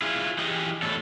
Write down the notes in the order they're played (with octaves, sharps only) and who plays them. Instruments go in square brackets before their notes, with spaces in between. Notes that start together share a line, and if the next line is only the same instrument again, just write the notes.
[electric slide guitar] E4 F4 G#4
E3 G4 G#4 D#5
E2 A2 A4